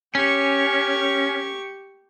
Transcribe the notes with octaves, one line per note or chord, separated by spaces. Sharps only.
C#4 G4 C#6